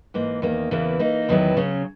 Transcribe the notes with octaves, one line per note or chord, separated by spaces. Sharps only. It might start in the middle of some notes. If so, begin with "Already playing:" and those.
G#2 E3 A#3
E2 D#3 A#3
E2 C#3 E3 A#3 E4
E3 A#3 D#4
E2 D#3 F#3 B3 E4
C#3 F#3 C#4